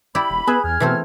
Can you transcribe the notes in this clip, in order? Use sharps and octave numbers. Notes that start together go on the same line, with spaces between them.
E4 G4 D5 B5
E1
B3 G#4 B4 E5
E2 F6 G#6
B2 E3 A3 C4